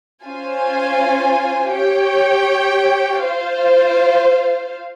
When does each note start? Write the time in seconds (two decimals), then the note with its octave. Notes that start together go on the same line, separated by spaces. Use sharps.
0.25 C#4 F4 C5 F5 G#5
1.74 G4 C#5 G5
3.25 F4 C5 F5